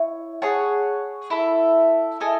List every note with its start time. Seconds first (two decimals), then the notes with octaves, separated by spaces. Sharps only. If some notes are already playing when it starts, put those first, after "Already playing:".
Already playing: E4 C#5
0.42 G#4 C#5 F#5 A5
1.30 E4 A4 E5
2.20 E4 A4 D#5 G#5